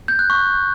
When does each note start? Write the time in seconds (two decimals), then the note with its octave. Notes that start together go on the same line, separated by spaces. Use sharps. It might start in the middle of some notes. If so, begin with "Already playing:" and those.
0.08 G6
0.19 F#6
0.30 C#6